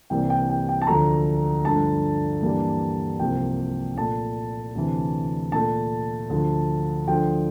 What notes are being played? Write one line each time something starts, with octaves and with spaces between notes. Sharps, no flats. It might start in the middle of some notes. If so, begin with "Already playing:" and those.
C2 C3 E3 G3 A#3 G5
G5
G5
G5
A5
D2 D3 F3 A3 A#5
G2 D3 F3 A3 A5
G2 E3 G3 A#3
C2 C3 F3 A#3 G5
A#2 A3 A5
D2 C3 E3
A#2 A3 A5
D2 D3 F3
D2 D3 F3 G5